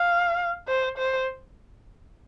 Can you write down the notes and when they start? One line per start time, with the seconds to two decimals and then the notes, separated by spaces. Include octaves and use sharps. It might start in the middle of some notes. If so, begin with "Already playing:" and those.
Already playing: F5
0.68 C5
0.98 C5